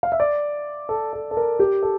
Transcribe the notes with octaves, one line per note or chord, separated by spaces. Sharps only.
F5
E5
D5
A4
A4
A4
A#4
G4
A4